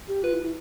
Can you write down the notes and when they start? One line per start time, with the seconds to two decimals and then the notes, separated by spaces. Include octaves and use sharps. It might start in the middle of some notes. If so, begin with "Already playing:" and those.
0.08 G4
0.23 F4 B4
0.33 E4
0.43 E4